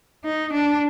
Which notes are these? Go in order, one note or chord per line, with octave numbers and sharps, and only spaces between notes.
D#4
D4